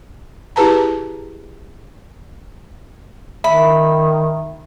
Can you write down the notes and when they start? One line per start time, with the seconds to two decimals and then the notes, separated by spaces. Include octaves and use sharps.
0.56 E4 G4 G#4 B4 A5 A#5
3.44 D#3 E5 B5